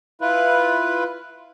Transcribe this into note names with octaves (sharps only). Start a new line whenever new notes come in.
E4 F4 B4